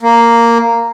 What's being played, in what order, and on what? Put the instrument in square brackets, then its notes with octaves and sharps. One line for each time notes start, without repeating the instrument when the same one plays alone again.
[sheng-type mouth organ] A#3